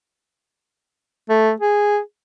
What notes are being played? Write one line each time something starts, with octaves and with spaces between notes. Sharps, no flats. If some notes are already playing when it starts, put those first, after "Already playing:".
A3
G#4